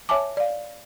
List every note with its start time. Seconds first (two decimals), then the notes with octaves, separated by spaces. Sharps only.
0.09 C#5 E5 G#5 A5 D6
0.37 D5 F5